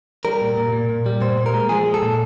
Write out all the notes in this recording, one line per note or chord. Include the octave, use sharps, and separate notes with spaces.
G3 A#4
A#2
A#2
A#2
A#2
G3
A#2 C5
A#2
A#4
G#3
F3 G#4
G#3
A4
A#2